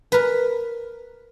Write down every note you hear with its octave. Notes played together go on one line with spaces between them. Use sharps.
A#4 B4